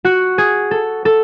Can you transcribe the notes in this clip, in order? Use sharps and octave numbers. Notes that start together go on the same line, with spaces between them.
F#4
G#4
A4
A4